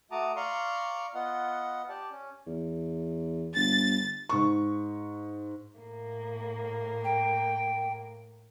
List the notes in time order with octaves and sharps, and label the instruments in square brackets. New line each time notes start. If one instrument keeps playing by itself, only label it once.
[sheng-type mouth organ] A3 F#4 A5 A#5 D6 D#6
D5 F5 A#5 C6 C#6
B3 F4 D#5 F#5
G4 D5 A5
C#4
[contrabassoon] E2
[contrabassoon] G1 [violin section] A6
[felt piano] G#2 C#6
[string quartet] A2 A#3
[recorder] G5